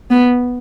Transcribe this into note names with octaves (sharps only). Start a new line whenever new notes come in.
B3